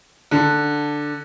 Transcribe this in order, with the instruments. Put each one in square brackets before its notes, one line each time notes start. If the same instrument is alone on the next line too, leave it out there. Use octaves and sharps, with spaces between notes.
[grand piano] D3